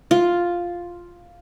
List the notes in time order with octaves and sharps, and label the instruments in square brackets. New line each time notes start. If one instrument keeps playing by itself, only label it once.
[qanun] F4